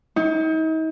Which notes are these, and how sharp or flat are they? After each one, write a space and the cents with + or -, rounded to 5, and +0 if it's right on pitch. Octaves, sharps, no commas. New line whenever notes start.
D#4 +40